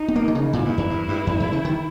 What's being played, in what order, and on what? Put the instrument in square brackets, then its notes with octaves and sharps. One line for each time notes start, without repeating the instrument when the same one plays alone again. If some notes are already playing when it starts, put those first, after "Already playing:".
Already playing: [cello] D#4
[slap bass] B3
A#3
D#3
C#3
[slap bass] A#2 [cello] E4
[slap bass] G2
E2
G2
G2
E2
E2
C#3
D#3